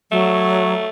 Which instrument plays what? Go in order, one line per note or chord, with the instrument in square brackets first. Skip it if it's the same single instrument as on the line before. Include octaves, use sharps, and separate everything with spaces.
[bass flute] F#3 [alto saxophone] A3